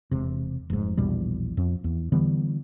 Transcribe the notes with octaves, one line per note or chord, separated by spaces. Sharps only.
E1 C3
F1 G#2
A#1 E2 B2 G3
F2
E2
D3 E3 G3 B3